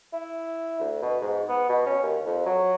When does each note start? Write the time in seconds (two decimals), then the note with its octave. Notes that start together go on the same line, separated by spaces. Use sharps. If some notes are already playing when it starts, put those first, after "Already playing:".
0.13 E4
0.80 D2
1.02 B2
1.21 G#2
1.49 B3
1.69 B2
1.87 C#4
2.03 D#2
2.26 F2
2.46 F#3